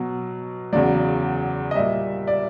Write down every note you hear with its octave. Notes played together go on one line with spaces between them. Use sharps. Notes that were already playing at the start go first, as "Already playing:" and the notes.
Already playing: B2 F#3
E2 C#3 F#3 D5
D#5
A#2 G3 E5
D5